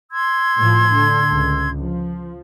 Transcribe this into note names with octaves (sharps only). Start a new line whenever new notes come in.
C6 E6 G#6
A2 F3
D3
C#2
F3